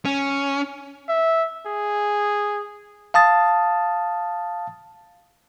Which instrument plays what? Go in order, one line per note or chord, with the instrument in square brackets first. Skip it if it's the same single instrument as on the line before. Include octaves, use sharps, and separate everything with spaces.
[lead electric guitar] C#4
[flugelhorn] E5
G#4
[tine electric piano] F5 A5 D#6 A6